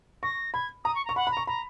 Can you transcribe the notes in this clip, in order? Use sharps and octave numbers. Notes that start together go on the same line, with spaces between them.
C#6 A#6
B5 G#6
A#5 D#6
C#6
A#5 C#6
F#5 B5
B5
A#5
C#6
A#5 B5